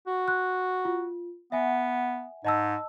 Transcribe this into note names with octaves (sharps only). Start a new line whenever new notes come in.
F#4
C6 F#6
F4
B3 E5 F#5 G#5
G#2 D#5 A5 E6